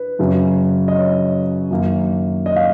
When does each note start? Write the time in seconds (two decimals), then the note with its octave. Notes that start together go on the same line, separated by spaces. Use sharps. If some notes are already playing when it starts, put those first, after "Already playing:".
Already playing: B4
0.19 F#2 C#3 F#3
0.88 D#5
0.95 C#5
1.70 F#2 D#3 A#3
2.46 D#5
2.56 F5